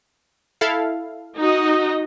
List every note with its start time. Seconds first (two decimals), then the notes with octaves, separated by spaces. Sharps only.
0.61 E4 A4 F5
1.39 D#4 F#4 D#5